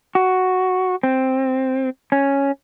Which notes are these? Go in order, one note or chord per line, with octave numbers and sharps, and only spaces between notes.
F#4
C4
C#4